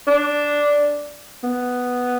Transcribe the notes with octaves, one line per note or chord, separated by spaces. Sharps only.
D4
B3